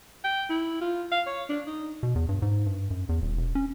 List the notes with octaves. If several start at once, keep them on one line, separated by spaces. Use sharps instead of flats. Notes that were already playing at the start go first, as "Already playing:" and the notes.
G5
E4
F4
F5
C#5
D4
D#4
B2
E2
G2
G#2
G2
F#2
E2
D#1
E1
C#4